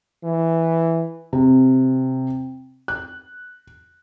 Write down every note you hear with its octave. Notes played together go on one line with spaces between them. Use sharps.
E3
C3
F#6